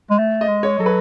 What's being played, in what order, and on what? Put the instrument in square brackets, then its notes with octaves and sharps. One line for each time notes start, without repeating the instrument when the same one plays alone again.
[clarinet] G#3
A3
[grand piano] D#5
[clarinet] G#3
[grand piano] C#5
[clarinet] F#3 [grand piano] A4
[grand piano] B4